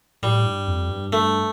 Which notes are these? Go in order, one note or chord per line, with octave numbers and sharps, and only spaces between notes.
A2 G3
G2
F2
G2
G2 A3